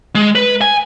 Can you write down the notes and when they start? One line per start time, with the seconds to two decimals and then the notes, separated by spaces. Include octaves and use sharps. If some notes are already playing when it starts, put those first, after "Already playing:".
0.15 G#3
0.35 B4
0.61 G#5